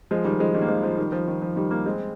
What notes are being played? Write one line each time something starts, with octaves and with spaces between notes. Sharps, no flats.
F3 G#3
D#3 G3
F3 G#3
D#3 G3
A#3
F3 G#3
F3
D#3 G3
F3
D#3
F3
D#3 G3
G3 A#3
G#3 C4